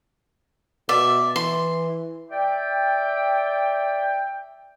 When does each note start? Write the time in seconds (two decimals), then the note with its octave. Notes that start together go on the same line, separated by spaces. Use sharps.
0.89 B2 D5 E5
1.36 E3 C6
2.31 D5 E5 G5